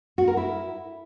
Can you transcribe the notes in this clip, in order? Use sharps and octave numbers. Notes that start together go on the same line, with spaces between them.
F#4
A#4
E4